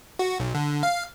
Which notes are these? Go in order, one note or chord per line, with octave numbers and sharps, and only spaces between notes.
F#4
B1
D3
F5